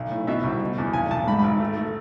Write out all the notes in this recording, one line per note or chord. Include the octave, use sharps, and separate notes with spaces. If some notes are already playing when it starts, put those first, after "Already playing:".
Already playing: B1
A2
B2 E5
C2
B2
E2
B1 G#5
B1 A5
G#2 B5
B5
G#1
A3
A3